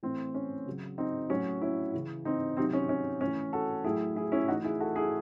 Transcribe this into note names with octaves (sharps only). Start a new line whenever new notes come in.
A2 E3 C4
C#4
C#3 F#3
C4 D#4
A2 F#3 C#4
C#4 E4
C#3 E3
C4 D#4
C3 D#3 F#3 C4 D#4
C#4
C#4
A2 E3 C#4
F#4 A4
A2 F#3 E4 G#4
E4 G#4
C#4 E4
A2 E3 D#4 F#4
E4 G#4
F#4 A4
E4 G#4